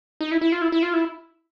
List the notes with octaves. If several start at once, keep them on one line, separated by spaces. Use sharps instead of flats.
D#4
E4
E4
F4
E4
E4
F4
E4